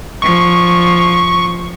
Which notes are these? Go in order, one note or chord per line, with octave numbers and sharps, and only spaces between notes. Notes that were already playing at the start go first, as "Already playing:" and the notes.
F3 C#6